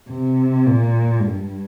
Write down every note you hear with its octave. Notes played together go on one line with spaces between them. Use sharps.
C3
A#2
G2